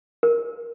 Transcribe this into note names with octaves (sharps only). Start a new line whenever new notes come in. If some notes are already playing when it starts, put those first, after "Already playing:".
A#4